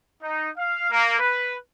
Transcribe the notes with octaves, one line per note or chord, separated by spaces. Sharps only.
D#4
F5
A#3
B4